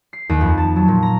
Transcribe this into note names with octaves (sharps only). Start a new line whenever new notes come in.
C7
D#2
F2
A5
F#3
A#2
A#5